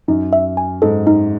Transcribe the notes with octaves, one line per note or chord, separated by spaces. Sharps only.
F#2 D#4
E5
G#5
G#2 A4
D#4